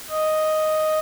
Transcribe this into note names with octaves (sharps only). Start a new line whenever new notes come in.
D#5